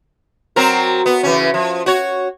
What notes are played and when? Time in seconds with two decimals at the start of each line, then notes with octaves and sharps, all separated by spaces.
0.56 F#3 C4 A#4
1.06 B3
1.23 C#3 E3 C#4
1.54 F3
1.86 F#4 C#5